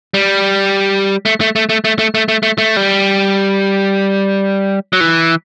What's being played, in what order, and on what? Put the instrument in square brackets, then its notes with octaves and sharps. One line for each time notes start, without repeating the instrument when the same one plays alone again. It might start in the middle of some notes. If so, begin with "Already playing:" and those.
[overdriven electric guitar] G3
A3
A3
A3
A3
A3
A3
A3
A3
A3
A3
G3
F#3
E3